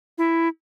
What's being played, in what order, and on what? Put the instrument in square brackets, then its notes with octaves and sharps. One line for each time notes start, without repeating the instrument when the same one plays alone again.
[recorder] E4